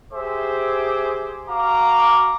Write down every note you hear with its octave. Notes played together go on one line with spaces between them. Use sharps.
G4 G#4 C5 E5 D6
F#4 F5 A#5 D6